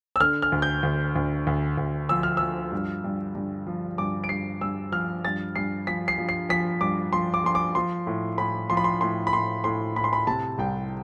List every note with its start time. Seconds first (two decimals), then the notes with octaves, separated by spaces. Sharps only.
0.16 E6
0.20 D3 F6
0.42 F6
0.52 D2
0.62 G6
0.83 D2
1.16 D2
1.47 D2
1.77 D2
2.09 F3 E6
2.23 F6
2.37 F3 E6
2.72 G2
3.04 G2
3.35 G2
3.67 F3
3.98 G2 D6
4.24 D7
4.29 G2 C7
4.61 G2 E6
4.92 F3 F6
5.25 G2 A6
5.56 G2 C7
5.87 F3 B6
6.08 C7
6.18 F3
6.29 C7
6.49 F3 B6
6.81 G2 D6
7.13 F3 C6
7.34 D6
7.44 F3 C6
7.55 D6
7.75 F3 C6
8.07 A2
8.38 A2 B5
8.70 F3 C6
8.77 B5
8.84 C6
9.01 A2 C6
9.27 B5
9.33 A2 C6
9.64 A2 C6
9.96 A2 B5
10.04 C6
10.13 B5
10.27 C3 A5
10.58 C2 G5